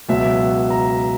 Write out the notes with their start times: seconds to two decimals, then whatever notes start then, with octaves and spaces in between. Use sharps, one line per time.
0.08 C#2 B2 F#3 E5
0.70 A#5